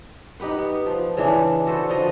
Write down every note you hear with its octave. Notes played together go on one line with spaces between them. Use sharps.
D#4 G4 B4 F#5
B3
F3
C#3 E3 D4
F#4 A4 B4 C5
D3 F3 D#5